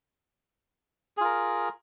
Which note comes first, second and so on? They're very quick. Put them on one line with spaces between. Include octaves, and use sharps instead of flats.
G#4 F4 A#4